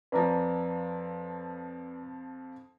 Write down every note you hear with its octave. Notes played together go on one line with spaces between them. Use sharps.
F2 F3 B4 D5 A#5